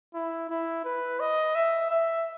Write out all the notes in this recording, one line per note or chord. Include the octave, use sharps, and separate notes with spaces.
E4
E4
B4
D#5
E5
E5